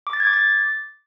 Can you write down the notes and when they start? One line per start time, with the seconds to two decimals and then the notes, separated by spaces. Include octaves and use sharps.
0.07 D6
0.13 A6
0.20 G#6
0.27 D6
0.33 A6